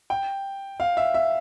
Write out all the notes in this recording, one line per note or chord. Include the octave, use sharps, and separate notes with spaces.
G5
F5
E5
E5